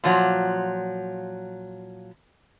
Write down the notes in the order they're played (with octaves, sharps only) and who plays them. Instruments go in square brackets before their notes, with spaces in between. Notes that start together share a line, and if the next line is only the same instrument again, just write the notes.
[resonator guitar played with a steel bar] A#2 F3 F#3